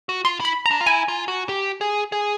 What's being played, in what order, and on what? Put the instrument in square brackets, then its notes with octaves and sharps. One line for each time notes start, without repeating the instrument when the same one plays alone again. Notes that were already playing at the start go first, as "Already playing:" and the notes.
[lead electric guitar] F#4
[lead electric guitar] F4 [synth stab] C6
[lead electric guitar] E4 [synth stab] B5
[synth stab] A#5
[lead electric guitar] D4
F4
[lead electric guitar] E4 [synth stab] G#5
[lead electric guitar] F4
F#4
G4
G#4
G#4